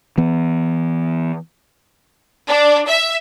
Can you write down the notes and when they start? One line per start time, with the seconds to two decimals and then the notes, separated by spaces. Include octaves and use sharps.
0.18 E3 B3
2.48 D4
2.88 E5